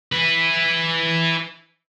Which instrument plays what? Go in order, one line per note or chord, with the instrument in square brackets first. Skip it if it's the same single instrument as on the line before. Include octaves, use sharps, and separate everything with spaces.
[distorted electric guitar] E4 B4